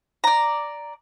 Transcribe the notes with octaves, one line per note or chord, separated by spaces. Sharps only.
D5 A#5